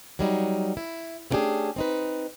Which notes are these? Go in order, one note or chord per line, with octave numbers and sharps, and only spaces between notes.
F#3 G3 D#4
E4
A3 B3 C#4 D4 G4 G#4
C4 D#4 B4